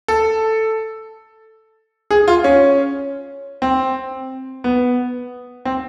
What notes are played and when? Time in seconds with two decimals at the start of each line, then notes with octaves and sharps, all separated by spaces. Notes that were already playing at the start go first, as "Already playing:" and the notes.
0.08 A4
2.11 G#4
2.28 F4
2.44 C#4
3.62 C4
4.64 B3
5.65 C4